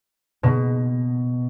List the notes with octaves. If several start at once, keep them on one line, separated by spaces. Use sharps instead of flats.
B2